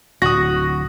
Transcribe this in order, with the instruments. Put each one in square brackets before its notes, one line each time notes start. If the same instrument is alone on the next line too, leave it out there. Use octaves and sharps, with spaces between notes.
[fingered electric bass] D1 [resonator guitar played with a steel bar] F#4 [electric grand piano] D#6 A#6